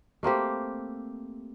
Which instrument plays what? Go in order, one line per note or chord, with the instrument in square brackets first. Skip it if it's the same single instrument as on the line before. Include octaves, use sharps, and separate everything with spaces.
[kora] A3 A#3 C4 G4